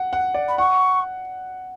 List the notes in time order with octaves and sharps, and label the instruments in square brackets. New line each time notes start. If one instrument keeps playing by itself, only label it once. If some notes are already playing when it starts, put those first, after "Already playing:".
Already playing: [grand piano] F#5
F#5
D5
[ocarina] B5
[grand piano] F#5 [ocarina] C#6